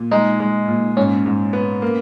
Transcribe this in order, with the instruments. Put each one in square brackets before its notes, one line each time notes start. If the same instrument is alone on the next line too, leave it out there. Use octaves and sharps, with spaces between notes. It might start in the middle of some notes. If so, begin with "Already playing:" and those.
Already playing: [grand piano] A#2
[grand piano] G#3 [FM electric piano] D#4
[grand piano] G#3
A#2
[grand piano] G#2 [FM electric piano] C#4
[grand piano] G#2
B3
A#3